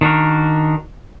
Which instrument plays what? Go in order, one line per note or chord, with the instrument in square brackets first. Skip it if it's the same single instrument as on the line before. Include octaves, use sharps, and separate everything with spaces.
[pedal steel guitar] D#3 D4 F#4 A#4